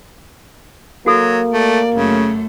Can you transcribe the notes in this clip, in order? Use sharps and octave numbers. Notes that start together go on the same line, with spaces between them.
F#3 A#3 F#4 A4
A3 D5
F#2 C#3 A3